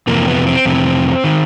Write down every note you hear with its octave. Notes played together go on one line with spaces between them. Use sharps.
F2 C3 E3 A#3
B3
C4
F2 C3 E3
D#3